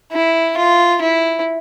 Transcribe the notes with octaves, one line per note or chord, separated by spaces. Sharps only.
E4
F4
E4